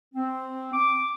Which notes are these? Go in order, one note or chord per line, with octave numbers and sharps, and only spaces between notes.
C4
D6